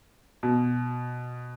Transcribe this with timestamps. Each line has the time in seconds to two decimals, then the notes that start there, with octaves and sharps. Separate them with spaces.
0.43 B2